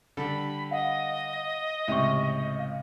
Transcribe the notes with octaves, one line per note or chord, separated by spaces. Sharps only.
D3 G3 A4 B5
D#5 F5 F#5
C#2 A2 C3 E5 C#6
F5